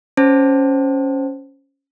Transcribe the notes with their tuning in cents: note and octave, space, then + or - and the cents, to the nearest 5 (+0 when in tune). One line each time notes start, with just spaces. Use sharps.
C#4 +0 C5 +0 A5 +0